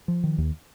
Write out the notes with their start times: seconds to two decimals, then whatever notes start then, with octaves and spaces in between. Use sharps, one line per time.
0.08 F3
0.24 D#3
0.38 D#2